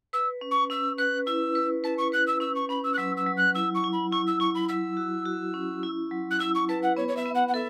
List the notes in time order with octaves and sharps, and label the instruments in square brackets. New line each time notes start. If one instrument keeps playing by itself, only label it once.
[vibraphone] B4 [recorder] E6
[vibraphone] C#4
[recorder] C#6
[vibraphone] C#4 [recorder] E6
[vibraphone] B4 [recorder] F#6
[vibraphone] E4 [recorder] E6
[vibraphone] B4
[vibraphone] B4 [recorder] A5
[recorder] C#6
[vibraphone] B4 [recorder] F#6
[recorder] E6
[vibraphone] C#4 [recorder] E6
[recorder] C#6
[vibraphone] C#4 [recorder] B5
[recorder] E6
F#6
[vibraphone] F#3 [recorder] E6
[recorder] E6
[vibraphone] F#3
[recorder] F#6
[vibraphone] E4 [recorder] E6
[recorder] C#6
[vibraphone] E4
[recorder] B5
[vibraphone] E4 [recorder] C#6
[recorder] E6
[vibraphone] E4 [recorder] C#6
[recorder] B5
[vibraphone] F#3 [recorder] E6
[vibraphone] F#4
F#4
C#4
E4
F#3
[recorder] F#6
[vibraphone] E4 [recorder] E6
[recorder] C#6
[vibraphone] B4 [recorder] A5
[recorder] F#5
[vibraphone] B3 [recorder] C#5
[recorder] C#5
E5
[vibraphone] B3
[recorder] F#5
F#5
[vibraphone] A4 [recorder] E5